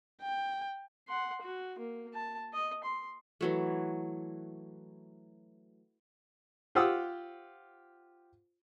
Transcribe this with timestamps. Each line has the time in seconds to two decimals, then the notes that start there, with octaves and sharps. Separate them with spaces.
0.22 G5
1.08 F#5 C6
1.42 F#4
1.79 A#3
2.14 A5
2.53 D#5
2.84 C6
3.41 E3 F#3 A3
6.75 F4 G4 C5 F#5 D#6 E6